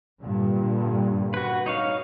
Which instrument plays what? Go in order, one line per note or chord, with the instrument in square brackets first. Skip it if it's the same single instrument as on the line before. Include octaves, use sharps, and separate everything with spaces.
[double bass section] G2 A#2 D3
[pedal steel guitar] F#4 B4
D#4 C#5 F5